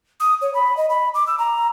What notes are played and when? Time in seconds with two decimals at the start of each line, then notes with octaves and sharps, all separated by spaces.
0.20 D#6
0.42 C#5
0.54 B5
0.77 D#5
0.90 B5
1.14 D6
1.27 E6
1.39 A#5